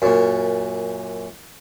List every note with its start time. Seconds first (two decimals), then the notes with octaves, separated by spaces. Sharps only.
0.02 F#2 A#2